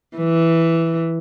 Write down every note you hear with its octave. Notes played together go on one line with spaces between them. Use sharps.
E3